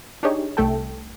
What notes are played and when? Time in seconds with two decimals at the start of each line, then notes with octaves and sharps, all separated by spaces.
0.23 D4 D#4 G4 G#4 C#5 D#5
0.57 C2 A3 A4 G5 A5